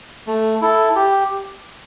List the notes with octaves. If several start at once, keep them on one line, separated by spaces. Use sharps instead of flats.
A3
E4 A4
G4